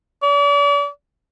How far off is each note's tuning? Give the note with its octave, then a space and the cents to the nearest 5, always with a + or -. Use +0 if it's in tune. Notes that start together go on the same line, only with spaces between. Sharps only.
D5 -40